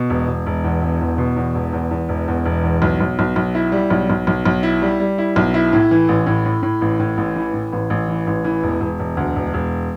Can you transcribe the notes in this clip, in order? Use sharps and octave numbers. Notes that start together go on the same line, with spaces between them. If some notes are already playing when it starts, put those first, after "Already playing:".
Already playing: B2
E1
E1
E1
E2
E1
E2
B2
E2
E1
E2
E2
E1
E2
E1
E2
B1
B1
B1
B1
E4
G3
B1
B1
B1
B1
E4
G3
G3
E4
B1
E4
A2
E3
A1
A2
A2
A2
A1
A2
A1
E3
A2
A1
A1
E3
A1
E3
E1
E1
E1
D2
E1
E1